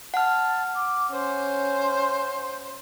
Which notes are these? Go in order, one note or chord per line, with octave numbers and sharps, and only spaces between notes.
F#5 A5 F6
D6
C#4 C5